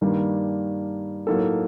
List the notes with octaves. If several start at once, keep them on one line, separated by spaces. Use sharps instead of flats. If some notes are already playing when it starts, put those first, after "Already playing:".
G2 D#3 G3 A#3 D4
A2 F#3 A#3 D#4 A4